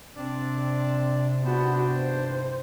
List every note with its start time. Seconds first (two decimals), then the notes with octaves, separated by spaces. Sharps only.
0.16 C3 C4 D4 D5
1.45 B3 D4 F#4 G5 A5
1.91 G2 C5